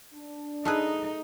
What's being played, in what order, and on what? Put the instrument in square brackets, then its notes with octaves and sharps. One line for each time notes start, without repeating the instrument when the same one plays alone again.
[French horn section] D4
[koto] A3 G#4 B4 [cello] D#4